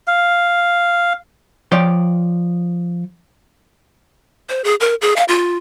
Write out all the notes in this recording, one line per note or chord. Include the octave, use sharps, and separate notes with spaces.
F5
F3 C#5 D5 G5
C5
G#4
A#4
G#4
F5
F4